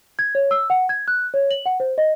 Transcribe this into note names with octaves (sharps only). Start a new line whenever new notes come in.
G#6
C#5
E6
F#5
G#6
F#6
C#5
F#7
F#5
C5
D#5